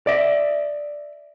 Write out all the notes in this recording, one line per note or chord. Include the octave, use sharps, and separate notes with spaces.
D5 E5